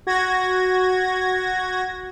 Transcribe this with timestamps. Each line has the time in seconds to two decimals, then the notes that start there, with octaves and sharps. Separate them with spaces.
0.07 F#4 G#6 A#6